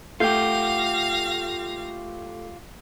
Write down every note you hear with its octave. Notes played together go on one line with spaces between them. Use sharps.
A3 F4 G4 F5 G6 A#6